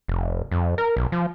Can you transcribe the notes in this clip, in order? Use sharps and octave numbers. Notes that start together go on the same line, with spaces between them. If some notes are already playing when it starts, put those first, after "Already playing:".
F1
F2
A#4
B1
F3